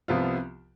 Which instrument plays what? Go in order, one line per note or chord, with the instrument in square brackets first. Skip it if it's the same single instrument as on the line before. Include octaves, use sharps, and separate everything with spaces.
[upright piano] C2 C3 F3 B3 F4